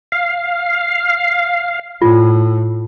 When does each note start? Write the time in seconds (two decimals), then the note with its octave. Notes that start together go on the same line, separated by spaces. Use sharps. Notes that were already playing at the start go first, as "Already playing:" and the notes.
0.12 F5
2.02 A2 F4